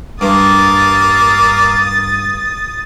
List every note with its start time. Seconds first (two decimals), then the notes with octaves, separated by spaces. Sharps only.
0.21 G2 A#3 D#6 A6